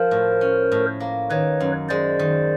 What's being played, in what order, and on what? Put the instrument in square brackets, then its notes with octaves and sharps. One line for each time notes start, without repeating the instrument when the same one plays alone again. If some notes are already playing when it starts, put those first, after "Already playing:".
Already playing: [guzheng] F3 [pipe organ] A#4 C5
[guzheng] A2
C#4
A2
A#3
[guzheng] D#3 [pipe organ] B4 C#5
[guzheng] F#2
[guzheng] G#3 [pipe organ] C5 D5
[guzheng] D#3